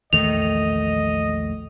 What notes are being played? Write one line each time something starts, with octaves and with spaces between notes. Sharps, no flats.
A#1 E2 D#3 A3 D#5 F7